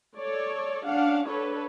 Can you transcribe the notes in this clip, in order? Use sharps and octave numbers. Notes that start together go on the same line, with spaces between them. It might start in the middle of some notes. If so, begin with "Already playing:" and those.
A4 C#5 D5
C#4 D4 F5 F#5
D4 A4 B4 C#5